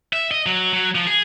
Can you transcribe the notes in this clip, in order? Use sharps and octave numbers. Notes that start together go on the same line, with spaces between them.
E5
D#5
F#3
F#3
F3
G#4